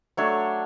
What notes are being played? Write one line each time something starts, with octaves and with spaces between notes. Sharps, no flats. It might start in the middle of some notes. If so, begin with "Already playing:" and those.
F#3 A3 D4 C#5